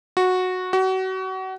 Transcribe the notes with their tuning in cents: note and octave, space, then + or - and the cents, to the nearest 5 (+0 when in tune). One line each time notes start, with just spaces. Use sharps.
F#4 -10
F#4 +30